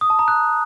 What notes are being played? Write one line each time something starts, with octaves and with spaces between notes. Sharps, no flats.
D#6
A5
A#5
F#6